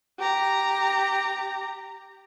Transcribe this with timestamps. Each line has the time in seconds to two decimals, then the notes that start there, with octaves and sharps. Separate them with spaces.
0.19 G4 A#5